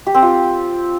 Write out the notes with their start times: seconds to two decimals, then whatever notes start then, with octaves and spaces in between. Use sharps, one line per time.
0.07 G4
0.14 C4
0.22 F4